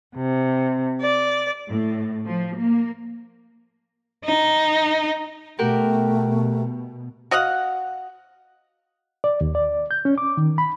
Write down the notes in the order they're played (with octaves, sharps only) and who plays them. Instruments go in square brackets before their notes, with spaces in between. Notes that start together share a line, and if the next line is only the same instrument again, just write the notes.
[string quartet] C3
D5
[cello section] A2
F3
A#3
[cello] D#4
[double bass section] B2 [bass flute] A3 [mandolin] F#4 G4 A#4
[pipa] F#4 D#5 F5 F#5
[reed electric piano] D5
D#2
D5
G6
C#4
D6
D#3
B5